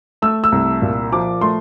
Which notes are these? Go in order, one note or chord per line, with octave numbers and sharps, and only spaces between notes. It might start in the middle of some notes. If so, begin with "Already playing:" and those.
A3 E6
E6
C2
A#2
F3 D6
A3 C6